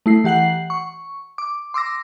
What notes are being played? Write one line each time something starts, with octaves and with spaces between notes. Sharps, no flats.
A3 E4 C7
E3 G4 F#5 C7 F#7
C#6
D6
C6 D6 E6 A#6